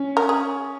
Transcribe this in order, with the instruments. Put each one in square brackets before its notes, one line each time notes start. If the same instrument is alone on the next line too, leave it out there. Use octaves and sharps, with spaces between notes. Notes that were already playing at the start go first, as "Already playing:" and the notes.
Already playing: [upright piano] C#4
[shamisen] A#4
G#4